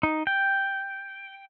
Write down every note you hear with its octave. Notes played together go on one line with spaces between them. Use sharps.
D#4
G5